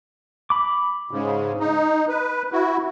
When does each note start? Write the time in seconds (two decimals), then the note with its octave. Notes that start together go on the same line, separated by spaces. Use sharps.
0.50 B5 D6
1.11 G#2 C#3
1.60 D#4
2.08 B4
2.52 E4 F#4